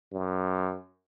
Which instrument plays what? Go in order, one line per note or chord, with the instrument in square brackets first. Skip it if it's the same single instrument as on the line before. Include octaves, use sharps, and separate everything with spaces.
[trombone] F#2